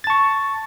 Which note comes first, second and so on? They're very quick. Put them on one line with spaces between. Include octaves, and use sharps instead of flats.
A6 A5 C#6